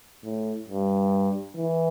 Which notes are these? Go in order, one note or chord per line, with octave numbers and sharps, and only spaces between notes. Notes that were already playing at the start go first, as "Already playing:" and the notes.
A2
G2
E3